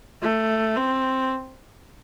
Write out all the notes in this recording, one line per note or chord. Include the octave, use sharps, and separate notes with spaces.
A3
C4